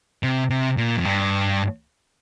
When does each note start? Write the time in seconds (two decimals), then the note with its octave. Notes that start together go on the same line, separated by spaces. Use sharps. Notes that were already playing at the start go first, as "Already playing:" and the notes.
0.23 C3
0.50 C3
0.77 A#2
0.97 F2
1.05 G2